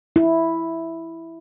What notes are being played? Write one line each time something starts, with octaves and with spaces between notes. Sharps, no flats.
E4